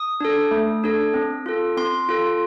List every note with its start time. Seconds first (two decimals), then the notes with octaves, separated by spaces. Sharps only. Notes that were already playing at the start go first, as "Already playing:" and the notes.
Already playing: D#6
0.20 D4 A4
0.51 A3
0.84 D4 A4
1.14 C4
1.46 F4 A4
1.77 C4 C6
2.09 F4 A4